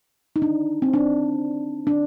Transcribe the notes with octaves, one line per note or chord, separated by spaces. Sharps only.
D#4
D4
C4
D4
D4